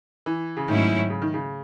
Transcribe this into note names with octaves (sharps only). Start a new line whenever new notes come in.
E3
C#3
G#2 D#3 F#3 A3 C#4 E4
C#3
D#3
C#3